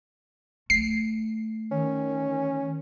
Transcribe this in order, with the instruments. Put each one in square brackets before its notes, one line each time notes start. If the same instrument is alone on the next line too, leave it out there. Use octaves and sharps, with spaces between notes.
[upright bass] A3 [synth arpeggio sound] C7
[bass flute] D#3 [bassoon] C#4